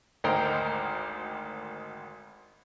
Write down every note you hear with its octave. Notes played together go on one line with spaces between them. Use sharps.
G#1 D2 A#4 C5 D#5 G5